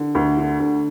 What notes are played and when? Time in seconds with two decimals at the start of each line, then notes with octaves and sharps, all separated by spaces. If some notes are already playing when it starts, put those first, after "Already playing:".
Already playing: D3
0.15 D2
0.37 D3
0.59 D2